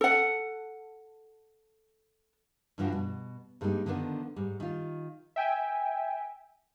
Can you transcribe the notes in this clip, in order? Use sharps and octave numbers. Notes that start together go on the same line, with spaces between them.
A4 F#5
G2 C#3 E3 F3 D4 F#4
B2
G2 G3 G#3 A#3 B3 D#4
D3 D#3 F3 B3 D4
G#2 G3
D#3 F4
E5 G5 G#5